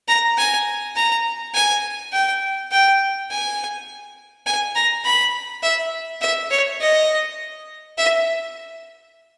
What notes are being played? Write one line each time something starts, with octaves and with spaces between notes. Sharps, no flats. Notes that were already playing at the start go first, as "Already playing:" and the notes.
A#5
G#5
A#5
G#5
G5
G5
G#5
G#5
A#5
B5
E5
E5
C#5
D#5
E5